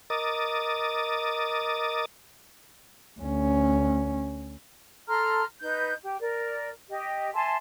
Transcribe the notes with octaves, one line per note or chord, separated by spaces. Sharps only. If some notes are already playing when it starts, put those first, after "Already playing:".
A#4 D#5 D6 D#6 A6
D2 C#4
A4 A#5 C6 F6
D#4 B4 G6
G4
A#4 D5
G4 D#5
E5 G#5 A5 C6